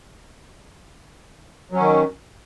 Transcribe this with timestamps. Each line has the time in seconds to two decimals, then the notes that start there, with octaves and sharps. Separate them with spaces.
1.72 F#3
1.76 C#4
1.79 D#3